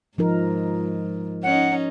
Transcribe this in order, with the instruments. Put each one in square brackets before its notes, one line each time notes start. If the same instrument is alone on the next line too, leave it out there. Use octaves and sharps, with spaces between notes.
[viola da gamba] G#2 [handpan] F3 D#4 A#4
[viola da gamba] C#4 D#4 [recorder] F#5